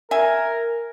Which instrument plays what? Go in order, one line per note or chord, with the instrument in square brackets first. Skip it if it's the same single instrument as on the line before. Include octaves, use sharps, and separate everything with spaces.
[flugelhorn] A#4 [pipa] E5 G#5